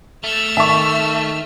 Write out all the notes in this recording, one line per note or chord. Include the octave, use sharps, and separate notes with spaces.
A3 E6 F6
D#3 E5 A5 C#6